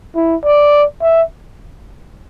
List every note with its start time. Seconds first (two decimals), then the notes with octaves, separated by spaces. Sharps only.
0.15 E4
0.44 D5
1.02 E5